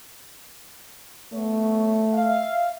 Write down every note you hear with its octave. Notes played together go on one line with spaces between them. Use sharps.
B1 A3 B3 C#5
E5 F5